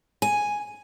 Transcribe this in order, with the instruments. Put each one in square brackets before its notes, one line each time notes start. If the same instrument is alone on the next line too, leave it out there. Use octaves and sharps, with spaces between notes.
[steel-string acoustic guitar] G#5